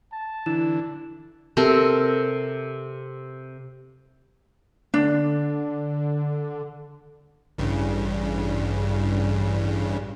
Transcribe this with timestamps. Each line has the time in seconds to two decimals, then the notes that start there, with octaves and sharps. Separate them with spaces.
0.12 A5
0.46 D3 E3 E4 E7
1.57 C3 C4 A4 A#4
4.94 D3 D4
7.58 A1 G2 C#3